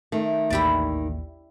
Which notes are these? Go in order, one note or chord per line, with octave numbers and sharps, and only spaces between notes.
D#3 A3
A1 D#2 E4 G4 D5